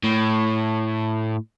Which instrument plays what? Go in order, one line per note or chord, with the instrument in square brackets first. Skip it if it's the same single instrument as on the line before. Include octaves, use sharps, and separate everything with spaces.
[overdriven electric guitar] A2